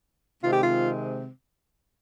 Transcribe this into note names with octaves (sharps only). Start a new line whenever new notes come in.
C3 D#3 G#3 C4 F4
G4
F4